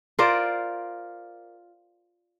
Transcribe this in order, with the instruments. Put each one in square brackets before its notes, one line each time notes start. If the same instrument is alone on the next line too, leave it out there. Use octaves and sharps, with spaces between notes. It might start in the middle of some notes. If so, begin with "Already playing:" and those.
[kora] F4 A#4 C5 D5